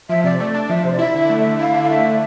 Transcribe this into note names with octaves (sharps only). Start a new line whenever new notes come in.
F3 E5
C3 D5
A3 D5
D4
F3 E5
C3 C5
D5
E4 E5
D3 E5
A3
E5
D3
E4 F5
D3
F5
A3 E5
D3